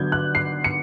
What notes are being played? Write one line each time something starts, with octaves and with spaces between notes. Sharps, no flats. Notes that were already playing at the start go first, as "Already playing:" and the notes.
Already playing: D3 F#3 B3 G6 G#6
F#6
C7
C#7